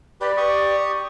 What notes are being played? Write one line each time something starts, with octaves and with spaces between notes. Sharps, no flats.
G4 B4 D5
G4 C#6 D#6